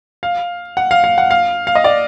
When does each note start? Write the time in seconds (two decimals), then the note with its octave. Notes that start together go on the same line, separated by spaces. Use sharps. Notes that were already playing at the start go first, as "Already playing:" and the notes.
0.23 F5
0.77 F#5
0.91 F5
1.04 F5
1.18 F#5
1.31 F5
1.67 F5
1.75 D#5
1.84 D5